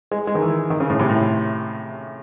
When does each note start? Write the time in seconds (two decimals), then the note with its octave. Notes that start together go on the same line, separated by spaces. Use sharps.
0.11 G#3
0.27 G#3
0.35 D#3
0.42 E3
0.70 D#3
0.80 C#3
0.90 A2
0.99 C3
1.09 A2